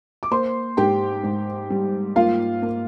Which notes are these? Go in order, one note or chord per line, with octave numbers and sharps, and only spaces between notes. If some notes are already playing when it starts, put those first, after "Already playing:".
D6
A#3 C5 C6
G#2 G4 G5
G#2
G3
A#3 F4 F5
A#3